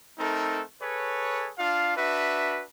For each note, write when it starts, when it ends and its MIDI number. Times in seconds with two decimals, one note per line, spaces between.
0.18 0.62 57
0.18 0.62 60
0.18 0.62 63
0.18 0.62 69
0.18 0.62 70
0.81 1.51 68
0.81 1.51 69
0.81 1.51 71
0.81 1.51 73
1.58 1.94 62
1.58 1.94 65
1.58 1.94 77
1.96 2.63 62
1.96 2.63 66
1.96 2.63 71
1.96 2.63 76